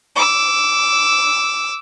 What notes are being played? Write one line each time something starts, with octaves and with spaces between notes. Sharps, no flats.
D6 E6